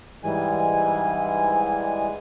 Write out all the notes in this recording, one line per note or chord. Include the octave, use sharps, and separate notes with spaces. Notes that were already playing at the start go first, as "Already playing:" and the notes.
G#2 E3 G3 G#3 G#5